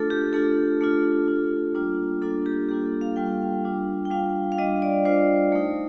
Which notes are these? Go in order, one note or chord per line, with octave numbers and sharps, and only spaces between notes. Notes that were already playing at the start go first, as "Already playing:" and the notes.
Already playing: A3 D4 F4 A4
G4
A3 D4 F4 A4
A3 D4 F4
A3 D4 F4
G3 A#3 D4 F4
G3 A#3 D4 F4 A4
G4
G3 A#3 D4 F4 G4
A4
F5
G3 A#3 D4 F4 G5
G3 D4 F4
G5
G3 D4 F4 F5
F5
G3 D4 F4 D#5
D5
G3 D4 F4 C5
A3 D#4